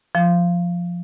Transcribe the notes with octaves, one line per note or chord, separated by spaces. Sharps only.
F3